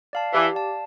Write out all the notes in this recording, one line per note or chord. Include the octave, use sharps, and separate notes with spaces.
D5 F5 A5
E3 G4
D5 F5 A5